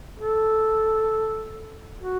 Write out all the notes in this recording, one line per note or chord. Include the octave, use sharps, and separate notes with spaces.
A4
F#4